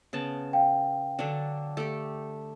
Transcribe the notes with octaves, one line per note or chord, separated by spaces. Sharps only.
C#3 B3 A5
F5 G5
D3 F#3 D4
A3 G4